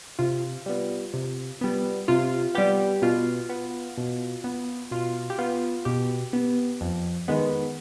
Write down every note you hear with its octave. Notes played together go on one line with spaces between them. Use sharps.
C3 F4
G3 B3
C3
G3 B3
C3 F4
G3 B3 G4
B2 F4
B3
B2
B3
B2 F4
G4
B3 F4
B2 G4
B3
F2
D#3 G#3 B3